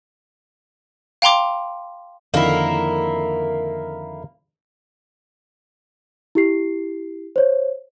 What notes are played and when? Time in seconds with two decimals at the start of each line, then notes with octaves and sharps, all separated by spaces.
1.22 F5 G5 A#5 C6 D6
2.34 F2 D3 D#3 A#3 E4
6.35 E4 G4 C7
7.36 C5 C#5